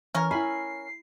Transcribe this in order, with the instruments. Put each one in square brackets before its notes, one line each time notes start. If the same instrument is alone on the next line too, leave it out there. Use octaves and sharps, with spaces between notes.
[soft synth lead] E3 [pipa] C#4 A#4
[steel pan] E4 B5 [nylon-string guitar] G#5 [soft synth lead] C7